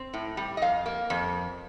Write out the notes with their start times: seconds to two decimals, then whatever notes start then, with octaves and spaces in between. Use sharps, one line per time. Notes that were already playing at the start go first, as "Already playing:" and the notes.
Already playing: C4
0.13 A2
0.37 G3
0.57 D#5
0.62 F2 F5
0.86 A#3
1.10 F2